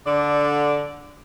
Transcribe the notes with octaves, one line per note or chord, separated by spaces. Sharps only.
D3 D5